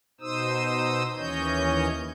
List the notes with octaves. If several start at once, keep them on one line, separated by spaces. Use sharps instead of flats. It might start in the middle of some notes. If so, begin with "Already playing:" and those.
B2 D#4 C5 D#6 E6
D#2 E3 C#4 C#5 D#5 G6